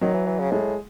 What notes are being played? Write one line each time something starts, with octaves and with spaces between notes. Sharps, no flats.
D#3 F#3
E3
E3
C#3
A2 G#3